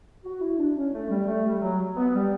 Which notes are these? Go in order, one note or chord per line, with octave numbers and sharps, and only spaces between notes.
F#4
E4
D4
C#4
A3
G3
A3
G3
F#3
B3
G3